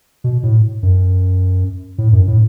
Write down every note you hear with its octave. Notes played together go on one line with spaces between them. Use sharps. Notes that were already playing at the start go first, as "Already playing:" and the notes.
B2
A2
F#2
A2
F#2
A2